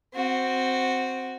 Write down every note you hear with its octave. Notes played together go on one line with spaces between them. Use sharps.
C4 F#4